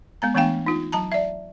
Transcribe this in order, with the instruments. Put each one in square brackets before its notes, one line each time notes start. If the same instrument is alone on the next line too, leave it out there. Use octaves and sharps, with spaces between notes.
[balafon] G#3 B3 A#5
E3 A3 B3 D4 F5 G5
D#4 F4
F#3 A5 A#5
D5 E5